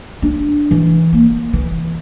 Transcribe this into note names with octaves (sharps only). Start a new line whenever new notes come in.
D4
E3
A#3
E3